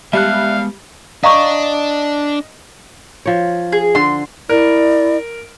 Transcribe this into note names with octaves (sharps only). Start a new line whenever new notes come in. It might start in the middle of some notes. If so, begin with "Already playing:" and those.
G3 G#3 B3 E5 F5 A5 F#6
D4 D#5 F5 A#5 C#6
F3 C#5
G#4
D3 C6
E4 A#4 D5